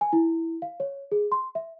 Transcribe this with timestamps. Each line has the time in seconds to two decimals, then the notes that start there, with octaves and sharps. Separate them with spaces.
0.01 G#5
0.13 E4
0.62 F5
0.80 C#5
1.12 G#4
1.32 C6
1.55 E5